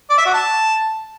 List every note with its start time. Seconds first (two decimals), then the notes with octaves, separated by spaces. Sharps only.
0.10 D5
0.18 E5
0.26 F#4
0.34 A5